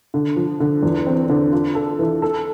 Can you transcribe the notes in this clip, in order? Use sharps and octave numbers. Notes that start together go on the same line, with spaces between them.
D3
F3
D3
E2
C4
D3
F4
A4
E3
A4